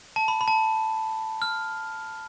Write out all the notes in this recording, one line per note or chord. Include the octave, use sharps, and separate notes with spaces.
A5
B5
B5
A5
F6